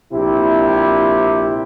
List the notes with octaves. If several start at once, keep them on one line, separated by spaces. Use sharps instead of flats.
A#1 C3 E4 G4